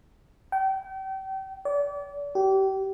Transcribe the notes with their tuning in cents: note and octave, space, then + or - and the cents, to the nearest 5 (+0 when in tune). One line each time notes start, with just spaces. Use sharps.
G5 -35
D5 -35
G4 -30